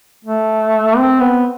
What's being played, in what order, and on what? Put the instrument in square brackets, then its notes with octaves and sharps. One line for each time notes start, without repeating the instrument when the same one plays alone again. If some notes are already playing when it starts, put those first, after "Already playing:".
[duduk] A3
C4
B3